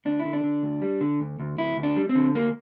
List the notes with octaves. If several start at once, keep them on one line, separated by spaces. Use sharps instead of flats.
D2 D4
E4
D3
D4
D3
D2
G3
D3
D2
D2
D2 E4
D2
D4
G3
C4
D3
D2 A#3